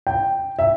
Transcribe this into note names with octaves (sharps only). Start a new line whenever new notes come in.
G5
E5